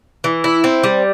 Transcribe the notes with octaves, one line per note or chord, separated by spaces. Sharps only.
E3
E4
C4
G3